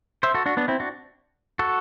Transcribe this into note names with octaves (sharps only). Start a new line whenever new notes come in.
C5 E5
F#4 A4
D4 F#4
B3 D4
C4 E4
D4 F#4
F#4 A4